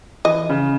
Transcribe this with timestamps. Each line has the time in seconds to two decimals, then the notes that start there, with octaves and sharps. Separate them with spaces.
0.25 E3 D#5
0.49 C#3